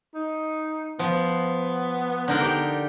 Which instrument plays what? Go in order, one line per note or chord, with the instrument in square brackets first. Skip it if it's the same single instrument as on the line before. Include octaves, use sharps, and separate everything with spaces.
[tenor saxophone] D#4
[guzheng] F3 [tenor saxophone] B3
[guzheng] D3 D#4 A#4
G4